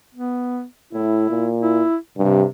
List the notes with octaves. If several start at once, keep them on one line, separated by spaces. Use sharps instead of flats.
B3
A2 E4
A#2
E4
G2 C3